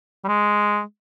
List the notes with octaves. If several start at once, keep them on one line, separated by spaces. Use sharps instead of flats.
G3
G#3